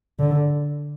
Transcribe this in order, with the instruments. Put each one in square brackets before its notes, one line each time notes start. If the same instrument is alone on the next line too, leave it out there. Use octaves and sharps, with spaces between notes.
[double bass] D3